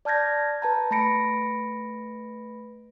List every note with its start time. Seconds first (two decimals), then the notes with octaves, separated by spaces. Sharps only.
0.05 D5 A5 F6 G6 G#6 A#6
0.62 B4 A5 A#5
0.91 A3 B4 B5 A#6 C#7 D7